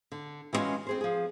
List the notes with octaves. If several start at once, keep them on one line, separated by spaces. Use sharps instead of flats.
D3
E3 G3 G#3 C#4 F4 F#4
C4 G#4 C5
F3 G#4